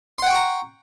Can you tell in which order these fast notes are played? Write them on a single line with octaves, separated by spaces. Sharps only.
C6 F#5 G5 C#6 A#5